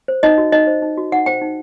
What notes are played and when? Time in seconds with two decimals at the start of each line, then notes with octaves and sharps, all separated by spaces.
0.08 C5
0.23 D#4 D#5
0.38 F#4
0.52 D#4 D#5
0.67 C5
0.82 D#4
0.97 F#4
1.12 D#4 F#5
1.26 C5 G5
1.42 D#4